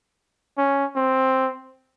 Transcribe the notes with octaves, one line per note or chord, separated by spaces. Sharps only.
C#4
C4